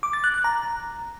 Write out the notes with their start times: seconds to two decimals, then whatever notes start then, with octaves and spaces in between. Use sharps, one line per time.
0.03 D6
0.13 A6
0.24 F#6
0.34 F#6
0.44 A#5